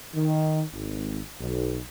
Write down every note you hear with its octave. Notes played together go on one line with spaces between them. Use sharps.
D#3
G#1
B1